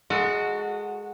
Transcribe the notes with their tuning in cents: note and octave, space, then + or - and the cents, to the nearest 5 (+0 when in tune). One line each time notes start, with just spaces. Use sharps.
G#3 +0 F#4 -5 A4 +35